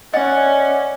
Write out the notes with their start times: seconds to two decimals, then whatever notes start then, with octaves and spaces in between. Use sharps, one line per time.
0.14 C#4 D5 D#5 F#5